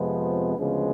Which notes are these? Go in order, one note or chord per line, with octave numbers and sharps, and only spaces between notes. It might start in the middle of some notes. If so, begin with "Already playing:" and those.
Already playing: F2 C3 F3 G#3 B3
D2 C#3 F3 G#3 B3